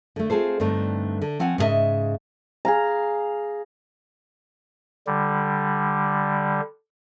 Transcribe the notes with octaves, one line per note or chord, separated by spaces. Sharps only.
D3 A3
C4 F4 G#4 A4 C5
G2 D3 A3 C4 D#4
D3
F3 C4 C#5 F#5 G#5
G#2 C#3 F4 A4 D#5 E5
G#4 F5 A#5
D3 G3